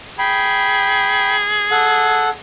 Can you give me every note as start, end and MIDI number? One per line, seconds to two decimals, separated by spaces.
0.19 2.37 68
0.19 1.36 79
0.19 1.36 83
1.71 2.29 69
1.71 2.29 78